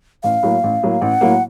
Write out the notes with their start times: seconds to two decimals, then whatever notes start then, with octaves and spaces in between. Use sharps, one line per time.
0.23 A1 F5
0.43 A2 F#3 A#3
0.63 A1
0.83 A2 F#3 A#3
1.01 A1 F#5
1.21 A2 F#3 A#3